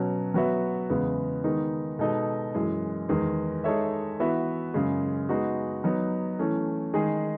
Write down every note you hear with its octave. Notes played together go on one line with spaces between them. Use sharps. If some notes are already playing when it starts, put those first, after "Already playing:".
Already playing: B2 F#3 C#4
F#3 B3 F#4 B4 E5
E2 C#3 G#3 B3
D#3 G#3 B3 D#4
B2 G#3 D#4 A4 D#5
F#2 E3 G#3
E2 D#3 G#3
G#3 D#4 A4 C#5 E5
E3 B3 F#4 B4 E5
F#2 C#3 G#3
G#3 B3 D#4 F#4
F#3 B3 D#4
E3 A3 C#4
D#3 G#3 D#4 G#4